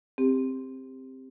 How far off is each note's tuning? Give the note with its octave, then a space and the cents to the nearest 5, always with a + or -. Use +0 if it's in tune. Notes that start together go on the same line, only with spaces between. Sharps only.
C4 +0 G4 +20